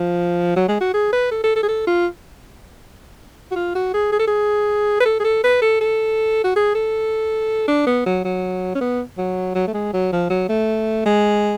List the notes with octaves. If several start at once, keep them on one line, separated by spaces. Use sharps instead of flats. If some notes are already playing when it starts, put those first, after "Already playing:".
Already playing: F3
F#3
G#3
F#4
G#4
B4
A4
A4
A4
G#4
A4
F4
F#4
F4
F#4
G#4
G#4
A4
G#4
B4
A4
G#4
A4
B4
A4
A4
F#4
G#4
A4
D4
B3
F#3
F#3
C#4
B3
F#3
F#3
A3
G#3
F#3
F3
F#3
A3
G#3